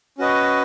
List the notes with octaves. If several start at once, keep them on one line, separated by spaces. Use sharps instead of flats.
C#4 F#4 B4 D#5